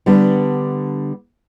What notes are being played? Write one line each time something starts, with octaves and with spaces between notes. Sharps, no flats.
D3 G3 B3 D4